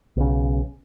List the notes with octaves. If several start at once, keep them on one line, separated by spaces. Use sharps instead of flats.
B1 C#3